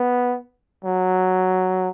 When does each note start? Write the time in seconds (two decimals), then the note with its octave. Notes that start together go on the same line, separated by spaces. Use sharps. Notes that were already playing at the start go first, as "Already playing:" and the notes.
Already playing: B3
0.85 F#3